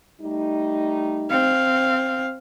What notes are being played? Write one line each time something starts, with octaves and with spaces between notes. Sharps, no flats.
G3 A3 D#4
C4 F5